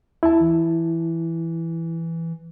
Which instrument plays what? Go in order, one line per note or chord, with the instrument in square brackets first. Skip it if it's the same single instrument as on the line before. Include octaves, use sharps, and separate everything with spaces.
[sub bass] D#2 [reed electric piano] E4 A5
[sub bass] E3